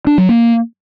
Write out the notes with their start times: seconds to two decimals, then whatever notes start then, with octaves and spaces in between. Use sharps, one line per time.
0.07 D4
0.18 F#3
0.29 A#3